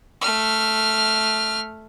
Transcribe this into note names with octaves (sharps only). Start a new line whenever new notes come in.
A3 F6